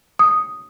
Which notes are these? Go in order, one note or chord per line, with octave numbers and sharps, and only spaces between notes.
D#6